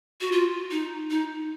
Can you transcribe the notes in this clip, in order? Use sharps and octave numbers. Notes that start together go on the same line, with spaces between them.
F#4
F4
D#4
D#4